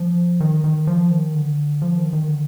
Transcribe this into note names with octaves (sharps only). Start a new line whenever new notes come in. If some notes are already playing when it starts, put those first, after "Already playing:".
Already playing: F3
D#3
D#3
F3
D#3
D3
F3
D#3
D#3
D3